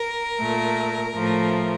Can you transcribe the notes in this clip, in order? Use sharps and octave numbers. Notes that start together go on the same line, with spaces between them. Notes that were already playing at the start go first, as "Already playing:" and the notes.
Already playing: A#4
A#2 A3
A2 F3 A3